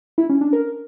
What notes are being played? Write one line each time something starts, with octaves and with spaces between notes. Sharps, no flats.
E4
C#4
D4
A#4